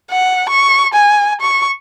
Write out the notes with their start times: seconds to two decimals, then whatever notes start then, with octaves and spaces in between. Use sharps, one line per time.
0.10 F#5
0.49 C#6
0.94 G#5
1.41 C#6